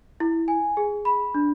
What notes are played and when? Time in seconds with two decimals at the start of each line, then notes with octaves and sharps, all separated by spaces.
0.20 E4
0.48 G#5
0.77 G#4
1.05 B5
1.34 D4